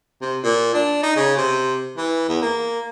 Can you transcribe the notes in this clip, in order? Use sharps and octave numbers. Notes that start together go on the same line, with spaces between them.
C3
A#2
D4
D#4
C#3
C3
E3
E2
A#3